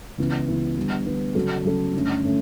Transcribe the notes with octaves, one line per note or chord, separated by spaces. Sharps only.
C#2 C#3 E3 B3 E4
C#2 C#3 E3 B3 E4
D3 G3 B3
D3 G3 B3
C#3 F#3 C#4 F#4 A4
C#3 F#3 C#4 F#4 A4
G2 D3 A3 C#4
D3 A3 C#4